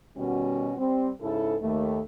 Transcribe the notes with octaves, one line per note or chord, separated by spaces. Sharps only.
B2 D#3 G3 C#4 F#4
G3 C4
G#2 C#3 E4 A4
D#2 A3